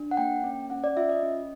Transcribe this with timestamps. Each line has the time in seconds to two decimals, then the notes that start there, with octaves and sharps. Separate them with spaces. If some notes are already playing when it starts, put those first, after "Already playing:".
Already playing: D4
0.11 F#5
0.17 A#3 G5
0.44 C#4
0.70 C#4 F#5
0.84 D5
0.97 F4 E5
1.09 D#5
1.23 C#4